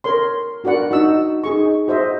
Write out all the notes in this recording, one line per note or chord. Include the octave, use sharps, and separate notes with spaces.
A#4 C#5 C6
D4 F#4 A#4 D5 F#5
D#4 F#4 E6
D#4 G#4 C#6
F#4 C5 D#5 E5